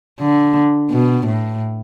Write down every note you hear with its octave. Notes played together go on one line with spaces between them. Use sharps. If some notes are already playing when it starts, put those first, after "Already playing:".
D3
B2
A2